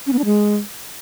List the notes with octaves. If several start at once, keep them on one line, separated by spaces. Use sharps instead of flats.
C#4
B3
D4
G#3